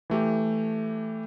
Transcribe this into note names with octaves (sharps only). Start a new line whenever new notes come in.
E3 A3 G4